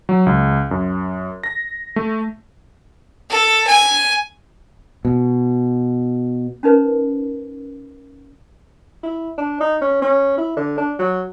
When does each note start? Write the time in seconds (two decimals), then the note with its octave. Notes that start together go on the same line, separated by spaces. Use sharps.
0.09 F#3
0.26 C#2
0.71 F#2
1.43 A#6
1.96 A3
3.30 A4
3.68 G#5
5.05 B2
6.63 C#4 D#4 A#4 B4
9.03 E4
9.38 D4
9.60 D#4
9.81 C#4
10.02 C#4
10.37 E4
10.56 D3
10.77 D4
10.99 F#3